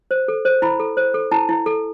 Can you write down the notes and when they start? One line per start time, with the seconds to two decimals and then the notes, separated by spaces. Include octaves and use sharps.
0.11 C5
0.28 A4
0.45 C5
0.62 E4 B5
0.80 A4
0.97 C5
1.14 A4
1.31 E4 A5
1.49 E4
1.66 A4